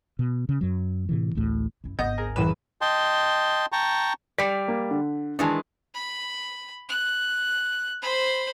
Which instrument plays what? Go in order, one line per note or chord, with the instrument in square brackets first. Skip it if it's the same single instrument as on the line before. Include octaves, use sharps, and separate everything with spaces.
[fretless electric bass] B2
C#3
F#2 F#3
A2 C3 E3
A1 D2 A2
[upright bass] F#2 E4
[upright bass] G#1 D2 [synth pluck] B3 G6 [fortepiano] D#5
[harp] G#4 A#4
[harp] F#1 E3 [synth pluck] C2 A2 E7 [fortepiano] B4
[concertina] D#5 G5 A5 C6
G5 A5 A#5 C#6
[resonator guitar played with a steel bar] G3 D5 [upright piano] B6
[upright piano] A#3
D3
[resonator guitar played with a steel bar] D#3 E3 G#3 [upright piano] D4 A5
[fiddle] B5
F#6
C5 B5